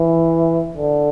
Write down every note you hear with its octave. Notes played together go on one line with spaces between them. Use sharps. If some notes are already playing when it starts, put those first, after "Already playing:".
Already playing: E3
D3